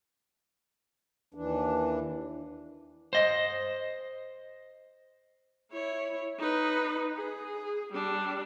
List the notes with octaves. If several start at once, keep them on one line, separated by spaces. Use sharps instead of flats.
D#2 E3 D4
C5 D#5
E4 C#5
D#4 B4
G#4
G3 D4